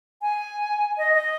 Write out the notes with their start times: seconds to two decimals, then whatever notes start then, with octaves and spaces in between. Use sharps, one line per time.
0.22 G#5
0.98 D#5
1.14 D#5